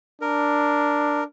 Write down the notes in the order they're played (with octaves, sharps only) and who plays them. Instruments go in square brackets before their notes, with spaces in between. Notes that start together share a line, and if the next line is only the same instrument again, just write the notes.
[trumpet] D4 [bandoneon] A#4